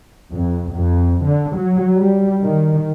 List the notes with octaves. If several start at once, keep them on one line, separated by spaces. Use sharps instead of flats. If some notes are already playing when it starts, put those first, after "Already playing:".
F2
F2
D3
F#3
G3
D#3